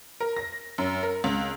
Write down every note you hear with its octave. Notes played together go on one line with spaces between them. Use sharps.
A#4
A#6
F#2
A#4
C#2